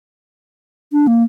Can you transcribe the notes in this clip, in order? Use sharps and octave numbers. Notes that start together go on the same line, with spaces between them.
D4
A#3